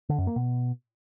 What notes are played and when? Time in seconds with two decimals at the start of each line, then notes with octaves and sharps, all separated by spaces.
0.09 D3
0.18 F#2
0.27 A#3
0.36 B2